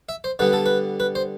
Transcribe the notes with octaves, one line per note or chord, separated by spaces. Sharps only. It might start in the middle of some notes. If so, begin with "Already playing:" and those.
E5
C5
D3 G3 B3 B4
A4
B4
B4
C5